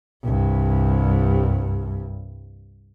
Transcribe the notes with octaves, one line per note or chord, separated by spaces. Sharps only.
C2 G2